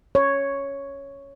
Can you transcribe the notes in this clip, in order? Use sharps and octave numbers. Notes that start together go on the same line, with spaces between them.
C#5